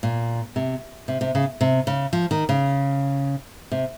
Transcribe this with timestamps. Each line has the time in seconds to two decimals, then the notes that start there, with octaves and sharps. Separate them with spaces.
0.03 A#2
0.56 C3
1.08 C3
1.21 C3
1.35 C#3
1.61 C3
1.87 C#3
2.13 F3
2.31 D#3
2.49 C#3
3.71 C3